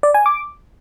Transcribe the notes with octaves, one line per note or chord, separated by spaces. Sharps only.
D5
G#5
D6